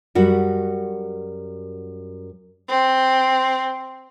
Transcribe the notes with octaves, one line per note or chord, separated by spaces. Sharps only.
F#2 G3 F#4
C4